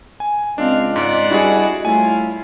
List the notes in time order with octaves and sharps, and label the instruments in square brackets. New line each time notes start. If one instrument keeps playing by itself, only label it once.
[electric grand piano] G#5
[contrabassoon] C#2 [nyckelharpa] C4 F5 [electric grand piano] D4 [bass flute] D#5
[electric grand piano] G#2 [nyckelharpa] D5 F#5
[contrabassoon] G2 [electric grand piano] E4 F#4 G#4
[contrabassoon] A2 [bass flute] G3 [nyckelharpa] E4 F4 [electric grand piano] G#5